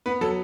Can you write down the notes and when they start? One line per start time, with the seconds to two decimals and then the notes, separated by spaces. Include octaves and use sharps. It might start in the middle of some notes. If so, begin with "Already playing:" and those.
0.06 B3 B4
0.21 F#3 A4